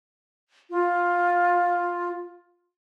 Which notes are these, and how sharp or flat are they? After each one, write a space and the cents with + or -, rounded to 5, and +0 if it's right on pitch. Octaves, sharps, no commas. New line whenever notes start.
F4 +10